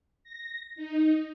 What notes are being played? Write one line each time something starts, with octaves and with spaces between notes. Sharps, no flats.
A#6
D#4